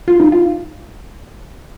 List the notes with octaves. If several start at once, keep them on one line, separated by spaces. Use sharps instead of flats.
F4
D#4
F4